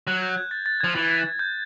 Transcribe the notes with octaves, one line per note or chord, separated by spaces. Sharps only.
F#3 F#6
G#6
G6
G#6
A6
A6
F3 G#6
E3
G6